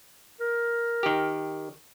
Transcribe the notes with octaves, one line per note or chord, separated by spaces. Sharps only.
A#4
D#3 G4